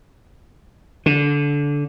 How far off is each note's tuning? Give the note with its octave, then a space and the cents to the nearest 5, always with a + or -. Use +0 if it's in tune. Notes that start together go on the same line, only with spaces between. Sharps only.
D3 -20